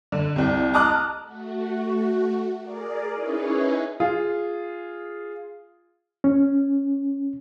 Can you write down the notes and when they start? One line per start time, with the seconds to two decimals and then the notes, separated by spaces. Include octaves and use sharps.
0.12 D3
0.36 C2 C3
0.74 A5 A#5 D6 D#6 F6 F#6
1.22 A3 F#4
2.61 G#4 A#4 D5
3.14 C#4 D#4 E4 G#4 B4 C#5
4.00 F4 G#4
6.24 C#4